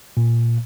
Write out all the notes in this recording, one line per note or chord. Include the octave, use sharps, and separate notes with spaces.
A#2